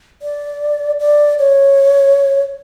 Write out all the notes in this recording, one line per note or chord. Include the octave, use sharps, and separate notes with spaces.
D5
D5
C#5